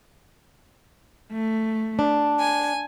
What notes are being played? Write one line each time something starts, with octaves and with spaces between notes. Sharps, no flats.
A3
D4
G#5